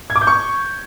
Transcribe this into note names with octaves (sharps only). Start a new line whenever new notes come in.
G#6
D6
G6
C#6